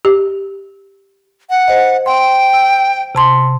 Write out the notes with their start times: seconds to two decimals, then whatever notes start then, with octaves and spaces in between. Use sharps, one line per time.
0.05 G4
1.50 F#5
1.68 C5 D#5
2.06 G5 C6
2.53 E6
3.15 C3 A5 C6